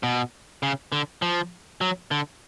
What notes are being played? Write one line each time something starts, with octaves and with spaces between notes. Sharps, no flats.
B2
C#3
D3
F3
F#3
D3